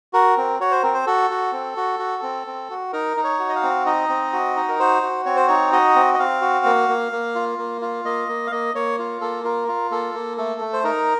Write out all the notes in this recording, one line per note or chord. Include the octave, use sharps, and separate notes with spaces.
F#4 A#4
C4
F#4 C#5
C5
C4 A#4
C5
F#4 A4
F#4
C4
F#4
F#4
C4
C4
F#4
D#4 A#4
D#4
C#5
F#4
D#5
F5
C4
D#4 D#5
C4
F#4
D#4
A#4
F#4 C5
F#4
C4 C#5
C5
D#4 C#5
F#4 D#5
C4
D#5
C4 F5
F#4
A#3
A#3
A#3
F4
A#3
F4
A#3 D#5
A#3
F5
A#3 D#5
A#3 C#5
F4
A#3 A4
F4 A#4
F4
A#3 A4
A#3
A3 A4
A3
C5
D#4 A#4